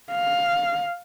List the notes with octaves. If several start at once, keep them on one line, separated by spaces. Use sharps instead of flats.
F5